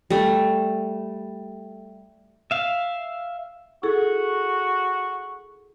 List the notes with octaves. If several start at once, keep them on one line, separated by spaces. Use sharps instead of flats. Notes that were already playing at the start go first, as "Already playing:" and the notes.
G3 A3
E5 F5
E4 F#4 G#4 A4